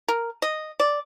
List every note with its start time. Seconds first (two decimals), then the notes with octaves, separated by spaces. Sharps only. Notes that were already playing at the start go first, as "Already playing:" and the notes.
0.08 A#4
0.42 D#5
0.80 D5